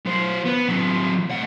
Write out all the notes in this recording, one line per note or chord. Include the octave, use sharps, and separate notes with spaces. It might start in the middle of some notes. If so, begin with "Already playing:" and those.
F#3 C5
B3
F#3 C4
A2 F#5